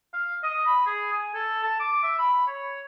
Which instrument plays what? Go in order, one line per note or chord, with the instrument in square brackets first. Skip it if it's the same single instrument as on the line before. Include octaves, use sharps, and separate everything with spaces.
[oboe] F5
D#5
B5
G#4
G#5
A4
A5
D6
E5
B5
C#5